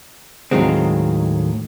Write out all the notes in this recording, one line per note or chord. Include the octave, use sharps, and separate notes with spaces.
D#2 A2 D#3 F#3 G#3 C4